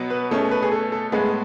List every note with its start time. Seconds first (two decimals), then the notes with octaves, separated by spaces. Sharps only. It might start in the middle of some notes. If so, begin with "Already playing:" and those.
Already playing: B2 F#3 B3
0.10 B4
0.31 B2 A3 C#4 G#4
0.51 B4
0.62 G#4
0.72 A4
0.92 A4
1.12 A2 G#3 B3 G#4